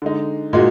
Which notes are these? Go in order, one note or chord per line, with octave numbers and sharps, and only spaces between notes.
D3 G#3 D#4
A#2 G#3 D#4 F#4